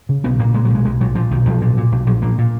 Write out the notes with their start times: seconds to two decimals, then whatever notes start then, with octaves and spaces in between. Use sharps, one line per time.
0.09 C#3
0.24 B1 B3
0.39 A#2 A#3
0.54 A#2 G#3
0.65 F#3
0.70 B1 G#3
0.85 B1 G#3
1.01 A#2 F#3
1.15 A#2 F3
1.31 B1 D#3
1.46 B1 F3
1.61 A#2
1.77 A#2
1.92 B1
2.06 A#1 F#3
2.22 A#2 A#3
2.38 A#2